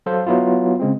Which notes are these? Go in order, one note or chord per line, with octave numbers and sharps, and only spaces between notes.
F#3 A4 C5 F5
F#3 B3 E4 F4
C#3 G#3 C4